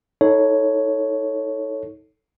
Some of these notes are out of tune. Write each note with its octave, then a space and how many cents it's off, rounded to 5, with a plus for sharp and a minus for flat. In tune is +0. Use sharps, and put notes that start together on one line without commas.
D#4 +30 A4 +0 C#5 +0